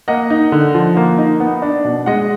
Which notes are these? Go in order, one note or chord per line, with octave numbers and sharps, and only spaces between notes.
A#3 D#5 F#5
D#4
D3
F3
A#3
D#4
B3
D4
B2
G#3 D#5 F#5